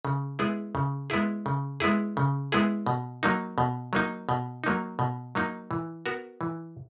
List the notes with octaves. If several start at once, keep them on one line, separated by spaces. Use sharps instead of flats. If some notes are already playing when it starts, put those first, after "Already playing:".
C#3
G#3 B3 E4 G#4
C#3
G#3 B3 E4 G#4
C#3
G#3 B3 E4 G#4
C#3
G#3 B3 E4 G#4
B2
F#3 A#3 D#4
B2
F#3 A#3 D#4
B2
F#3 A#3 D#4
B2
F#3 A#3 D#4
E3
B3 F#4 A#4
E3